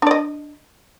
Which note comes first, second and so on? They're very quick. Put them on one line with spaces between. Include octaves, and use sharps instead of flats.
D4 D5 D#5